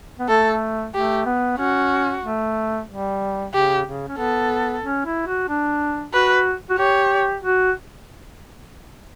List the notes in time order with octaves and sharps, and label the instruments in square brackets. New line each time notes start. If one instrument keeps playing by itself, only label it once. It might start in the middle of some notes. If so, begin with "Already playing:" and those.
[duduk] B3
[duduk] A3 [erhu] A4
[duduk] A3 [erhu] G4
[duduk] B3
[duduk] C#4 [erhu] F#4
[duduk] A3
G3
[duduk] C#3 [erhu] G4
[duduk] C#3
C#4
[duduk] B3 [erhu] A4
[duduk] C#4
E4
F#4
D4
[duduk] F#4 [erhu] B4
[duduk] F#4
[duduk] G4 [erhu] C#5
[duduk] F#4